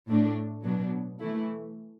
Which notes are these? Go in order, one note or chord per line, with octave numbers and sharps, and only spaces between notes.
A2 A3 D4
B2 F#3 B3 D4
E3 A3 E4